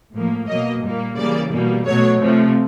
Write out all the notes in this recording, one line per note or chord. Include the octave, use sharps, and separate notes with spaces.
A2 F3 A#3
B2 F#3 A#3 D#5
A#2 G3 A#3
C#3 E3 G3 A#3 D5
B2 G3 A#3
B2 F#3 A3 C#5
C3 F3 A3